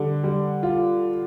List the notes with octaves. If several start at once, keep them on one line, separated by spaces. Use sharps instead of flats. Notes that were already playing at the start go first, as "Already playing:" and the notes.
Already playing: D3 G3
G3
F4